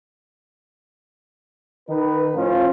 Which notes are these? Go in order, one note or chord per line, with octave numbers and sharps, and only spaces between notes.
D#3 D#4 B4
A2 F3 C#4 F4